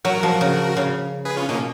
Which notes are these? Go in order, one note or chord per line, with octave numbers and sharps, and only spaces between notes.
F#3 F#4 A#4
F3
C#3
C#3
G#4 B4
C#4 F4
B2 A#3 C#4